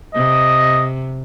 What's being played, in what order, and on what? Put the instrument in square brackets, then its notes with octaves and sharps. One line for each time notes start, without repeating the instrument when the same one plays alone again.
[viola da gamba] C3 [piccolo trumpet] D#5